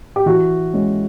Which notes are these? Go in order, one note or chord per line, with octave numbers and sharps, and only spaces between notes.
G4
E3 F#4
G#3 C#4